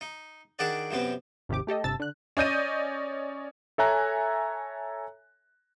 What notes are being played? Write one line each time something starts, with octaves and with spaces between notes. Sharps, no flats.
D#4
D#3 D4 F#4 G#4 D5
F#2 C3 B3 C4
G#1 D#2 C3 G4 D6
A3 G4 A4 D#5
G1 C3 A5 E6 A6
D3 F#6
C#4 D5 D#5 G6 A#6 D#7
A4 C#5 E5 G#5 A#5 F#6